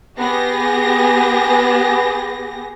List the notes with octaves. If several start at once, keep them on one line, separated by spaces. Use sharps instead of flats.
B3 G4 G#4 A#6